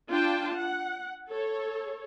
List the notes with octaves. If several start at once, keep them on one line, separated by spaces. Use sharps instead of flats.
D4 F4 G5 A5
F#5
A4 C#5